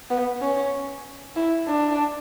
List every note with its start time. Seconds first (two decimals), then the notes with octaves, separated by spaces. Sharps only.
0.10 B3
0.41 C#4
1.36 E4
1.67 D4